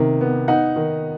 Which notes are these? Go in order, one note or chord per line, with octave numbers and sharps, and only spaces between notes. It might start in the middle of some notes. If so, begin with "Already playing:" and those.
Already playing: C3 D#3
B3
D#4 F#5
D#3